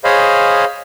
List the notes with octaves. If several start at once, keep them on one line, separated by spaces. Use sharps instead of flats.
G#4 C5 C#5 D#5 F5 B5